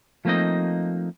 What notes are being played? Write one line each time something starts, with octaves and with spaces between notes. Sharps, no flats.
F3 A3 A#3 C4 D#4 D#5